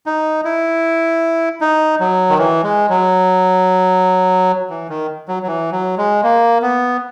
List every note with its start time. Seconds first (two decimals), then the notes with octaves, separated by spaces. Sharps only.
0.06 D#4
0.45 E4
1.61 D#4
2.00 F#3
2.30 D#3
2.38 E3
2.63 G#3
2.90 F#3
4.70 E3
4.89 D#3
5.28 F#3
5.43 F#3
5.47 E3
5.72 F#3
5.98 G#3
6.23 A#3
6.62 B3